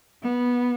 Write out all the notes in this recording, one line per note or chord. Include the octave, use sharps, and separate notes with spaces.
B3